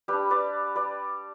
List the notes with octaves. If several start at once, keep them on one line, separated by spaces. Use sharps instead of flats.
G3 D4 G4 B4
B4 D5
B4 D5